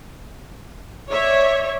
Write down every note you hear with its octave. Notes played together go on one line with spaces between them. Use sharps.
C#5 D5 E5